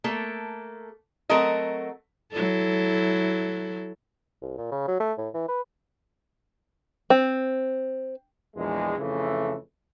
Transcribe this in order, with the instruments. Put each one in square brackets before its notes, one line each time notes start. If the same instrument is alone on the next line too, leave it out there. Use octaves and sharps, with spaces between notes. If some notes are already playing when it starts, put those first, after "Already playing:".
[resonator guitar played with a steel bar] A3 A#3 A4
F#3 A3 C4 A4 A#4 D#5
[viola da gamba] F#3 E4 A4
[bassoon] C2
A#2
C#3
F#3
A3
A2
E3
B4
[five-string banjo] C4
[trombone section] A#1 E2 G#3
F2 C#3 E3 A3